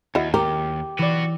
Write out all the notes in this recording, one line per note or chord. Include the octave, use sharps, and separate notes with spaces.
D#2 E4 F#4 D#5
G4 A#4
E3 F#4 B4 D5